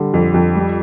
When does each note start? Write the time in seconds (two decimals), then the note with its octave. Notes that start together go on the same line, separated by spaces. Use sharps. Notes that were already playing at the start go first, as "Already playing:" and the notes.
Already playing: D3 G3
0.14 F2
0.34 F2
0.55 G3